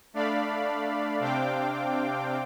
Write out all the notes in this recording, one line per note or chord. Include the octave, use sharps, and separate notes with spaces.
A3 D4 D5 F5 B5
C3 C4 D4 F5 G5 D6